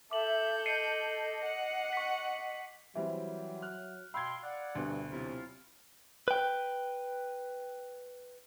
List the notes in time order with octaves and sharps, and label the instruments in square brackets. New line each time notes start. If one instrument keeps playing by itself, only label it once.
[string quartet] A4 G6 [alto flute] E5 [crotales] D6 F#7
[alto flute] D#5 [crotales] C7 C#7 D#7
[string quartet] F#5
[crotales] C#6 B6
[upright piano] E3 G3 C4 [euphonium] F#3 [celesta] E5
[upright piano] F6 F#6
[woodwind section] B2 G5 C6 [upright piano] F5 G#6 [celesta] B5 E6
[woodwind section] D5 F#5
[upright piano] D2 B2 [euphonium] G2
[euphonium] C3 [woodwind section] F#3 E4 F4
[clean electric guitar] B4 G5